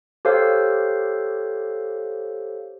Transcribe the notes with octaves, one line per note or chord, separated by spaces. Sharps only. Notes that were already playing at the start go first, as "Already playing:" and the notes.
G4 A4 C5 C#5 F5